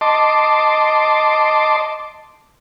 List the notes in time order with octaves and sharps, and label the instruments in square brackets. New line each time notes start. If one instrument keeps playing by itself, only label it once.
[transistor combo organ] D#5 A5 C6 D6